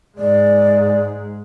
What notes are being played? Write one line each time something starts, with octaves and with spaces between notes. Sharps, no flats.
G#2 G#3 D5